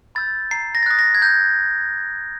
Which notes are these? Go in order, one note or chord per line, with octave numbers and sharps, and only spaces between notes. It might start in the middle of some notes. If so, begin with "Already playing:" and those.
B5 E6 G6 A6
A#5 C7
A#6
A6
D#6 F#6 A#6
A#6
G#6
A#5 G6